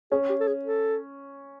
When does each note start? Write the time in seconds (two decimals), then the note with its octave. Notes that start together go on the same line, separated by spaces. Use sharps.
0.11 C#4 G#4
0.30 G4
0.40 A4
0.48 G#4
0.65 A4